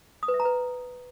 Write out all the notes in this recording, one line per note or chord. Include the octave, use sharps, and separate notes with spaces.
D#6
B4
E5
A#5
B4